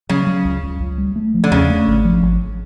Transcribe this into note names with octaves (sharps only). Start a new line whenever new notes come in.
C#3 F#3
F#3
C#2
C#2
C#2
G3
A3
F3
D3
E2 C#3
A3
G#1
F3
G#1